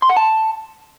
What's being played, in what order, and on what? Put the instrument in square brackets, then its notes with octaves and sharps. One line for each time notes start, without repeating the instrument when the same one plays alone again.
[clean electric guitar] C6
F#5
A5